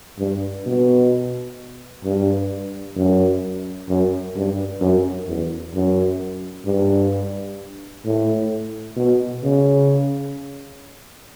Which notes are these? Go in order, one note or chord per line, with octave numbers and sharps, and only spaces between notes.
G2
B2
G2
F#2
F#2
G2
F#2
E2
F#2
G2
A2
B2
C#3